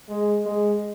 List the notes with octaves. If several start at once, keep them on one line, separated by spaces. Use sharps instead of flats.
G#3
G#3